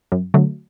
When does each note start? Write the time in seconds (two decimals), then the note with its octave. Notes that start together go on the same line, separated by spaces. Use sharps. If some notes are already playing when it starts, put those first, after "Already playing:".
0.12 F#2
0.34 D3 F#3 A3